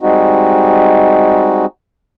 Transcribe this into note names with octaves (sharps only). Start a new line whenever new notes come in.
G3 G#3 C4 D#4 F#4